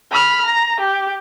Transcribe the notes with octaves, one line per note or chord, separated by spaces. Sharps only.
B5 F6
A#5
G4